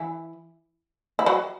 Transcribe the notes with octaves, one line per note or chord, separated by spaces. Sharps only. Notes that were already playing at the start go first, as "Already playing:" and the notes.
Already playing: E3 E4
E4
F#3 F#4